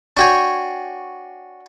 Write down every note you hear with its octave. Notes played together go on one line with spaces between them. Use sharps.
D4 F#4 C#5 G5 G#5 C#6